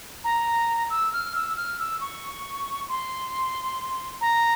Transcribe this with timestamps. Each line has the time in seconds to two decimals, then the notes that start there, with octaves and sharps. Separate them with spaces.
0.24 A#5
0.90 E6
1.13 F6
1.35 E6
1.57 F6
1.79 E6
2.01 C#6
2.89 C6
4.21 A#5